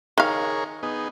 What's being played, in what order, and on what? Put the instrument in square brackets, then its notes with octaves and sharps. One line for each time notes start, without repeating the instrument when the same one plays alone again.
[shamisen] D#3 F5 [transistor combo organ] G#4 A#4 C#5
[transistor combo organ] B3 D#4 G#4